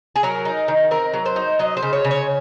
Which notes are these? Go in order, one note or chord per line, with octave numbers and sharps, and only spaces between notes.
G#4
F#3 A#4
D#4
D#3
C4 A#4
F#3
C5
D#4
F#3 D#5
C5
C#3
C#5
C#3
C#5